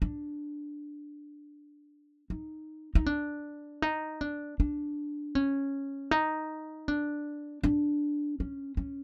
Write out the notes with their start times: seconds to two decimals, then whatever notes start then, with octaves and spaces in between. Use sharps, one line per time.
0.02 D4
2.30 D#4
2.95 D#4
3.06 D4
3.82 D#4
4.21 D4
4.60 D4
5.35 C#4
6.11 D#4
6.88 D4
7.63 D4
8.40 C#4
8.77 C#4